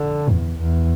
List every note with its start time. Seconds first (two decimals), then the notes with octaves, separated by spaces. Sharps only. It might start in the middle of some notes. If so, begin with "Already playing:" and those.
Already playing: D3
0.30 E2
0.59 E2